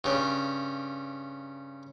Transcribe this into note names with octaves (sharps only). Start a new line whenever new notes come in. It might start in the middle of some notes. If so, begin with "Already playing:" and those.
G2 C#3